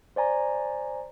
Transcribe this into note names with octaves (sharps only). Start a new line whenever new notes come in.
C5 D5 G#5 A#5